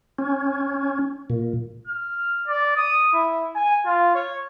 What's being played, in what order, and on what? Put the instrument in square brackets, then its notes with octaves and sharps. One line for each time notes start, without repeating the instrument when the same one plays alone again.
[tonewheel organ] C#4
A#2
[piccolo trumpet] F6
D5
D#6
E4
G#5
F4
C#5